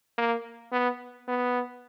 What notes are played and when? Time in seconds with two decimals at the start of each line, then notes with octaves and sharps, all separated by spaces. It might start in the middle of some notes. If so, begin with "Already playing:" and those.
0.18 A#3
0.72 B3
1.28 B3